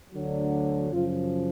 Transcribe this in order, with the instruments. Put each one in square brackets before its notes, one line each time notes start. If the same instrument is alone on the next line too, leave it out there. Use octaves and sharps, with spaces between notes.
[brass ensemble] D2 D3 F#3
F#2 C#3 F3 F4